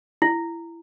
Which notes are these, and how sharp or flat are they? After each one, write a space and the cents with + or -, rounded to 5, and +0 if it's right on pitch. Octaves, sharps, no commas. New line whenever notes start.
E4 +25